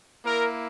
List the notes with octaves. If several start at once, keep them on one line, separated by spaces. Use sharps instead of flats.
A#3 E4 A#4